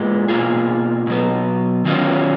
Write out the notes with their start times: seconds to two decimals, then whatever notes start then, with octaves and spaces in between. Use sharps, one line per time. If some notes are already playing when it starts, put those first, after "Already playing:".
Already playing: A#2 G#3 B3
0.28 B2 A#3 F4 G#4
1.07 B2 F#3 B3
1.85 D#3 F#3 C#4 F4